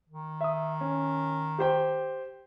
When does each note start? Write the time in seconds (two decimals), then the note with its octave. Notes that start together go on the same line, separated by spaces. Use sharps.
0.09 D#3
0.41 E5 D#6
0.81 C#4
1.59 G4 C5 G5